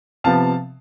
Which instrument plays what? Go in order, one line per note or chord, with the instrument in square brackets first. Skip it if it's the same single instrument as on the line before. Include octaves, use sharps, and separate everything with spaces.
[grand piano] C3 F3 B3 F5 A5